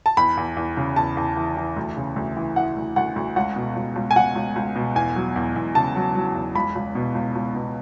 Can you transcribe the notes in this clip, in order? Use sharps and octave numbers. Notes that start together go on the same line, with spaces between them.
A5
E2 B5
E2
E2
C#3
E2 A5
E2
E3
E3
D2
C#3
D2
E3
E3 F#5
D2
D2 F#5
D2
C#2 F#5
B2
C#2
C#2
G#5
C#2 F#5
C#2
C#2
B2
E2 G#5
F#3
E2
E2
C#3 A5
F#3
F#3
E2
C#2 B5
C#2
B2
C#2
C#2
B2